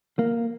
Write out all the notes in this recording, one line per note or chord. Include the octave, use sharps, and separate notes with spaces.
A#3